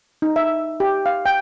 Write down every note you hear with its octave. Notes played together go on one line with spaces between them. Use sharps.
D#4
E5
G4
F5
G5